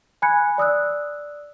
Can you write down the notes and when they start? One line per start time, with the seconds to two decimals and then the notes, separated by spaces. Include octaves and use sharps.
0.22 G#5 B5 F#6 G#6 C#7
0.58 D5 D#6 E6 F#6